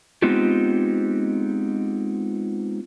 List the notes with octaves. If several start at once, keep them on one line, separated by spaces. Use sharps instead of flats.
G#3 B3 C4 D#4 F4 G4